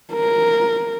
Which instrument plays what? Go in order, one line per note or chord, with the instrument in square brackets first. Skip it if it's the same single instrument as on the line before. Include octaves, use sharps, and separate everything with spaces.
[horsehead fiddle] A#4